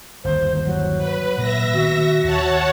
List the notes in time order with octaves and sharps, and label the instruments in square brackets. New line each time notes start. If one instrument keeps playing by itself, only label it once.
[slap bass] G1 D#2 [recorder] C5
[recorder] F#3
[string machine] B4
[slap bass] A#2 F#3 [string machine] E5 A#6
[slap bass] D#3 B3 [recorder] F#4
[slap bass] D#2 [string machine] C#5 F#5 A5